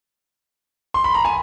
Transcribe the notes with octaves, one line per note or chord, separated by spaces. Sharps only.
C6
B5
A#5
G#5